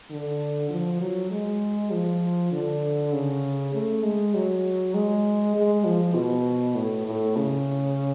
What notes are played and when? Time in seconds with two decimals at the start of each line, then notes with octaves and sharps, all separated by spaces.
0.11 D3
0.70 F3
1.01 F#3
1.31 G#3
1.92 F3
2.52 D3
3.13 C#3
3.74 A3
4.03 G#3
4.35 F#3
4.94 G#3
5.56 G#3
5.85 F3
6.15 B2
6.75 A2
7.06 A2
7.37 C#3